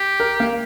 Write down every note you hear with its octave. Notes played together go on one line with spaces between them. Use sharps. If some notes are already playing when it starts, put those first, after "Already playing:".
Already playing: G4
A#4
A#3